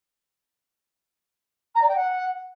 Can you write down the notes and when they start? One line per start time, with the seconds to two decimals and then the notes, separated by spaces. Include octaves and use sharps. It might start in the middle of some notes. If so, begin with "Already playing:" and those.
1.75 A#5
1.82 D5
1.88 G5
1.95 F#5